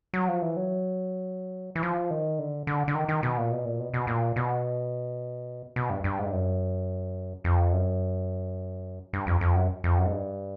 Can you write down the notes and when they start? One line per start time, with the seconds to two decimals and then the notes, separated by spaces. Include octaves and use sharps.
0.14 F#3
0.28 F3
0.42 E3
0.57 F#3
1.75 E3
1.83 F3
2.11 D#3
2.39 D3
2.67 D3
2.88 D3
2.95 D#3
3.08 D#3
3.23 B2
3.38 A#2
3.51 B2
3.65 A#2
3.79 B2
3.94 B2
4.07 A#2
4.36 B2
5.76 B2
5.90 G2
6.04 G2
6.18 G#2
6.25 G2
6.32 F#2
7.44 F2
7.73 F#2
9.13 G2
9.27 F2
9.41 F2
9.55 F#2
9.84 F2
9.98 F#2
10.06 G#2
10.12 G2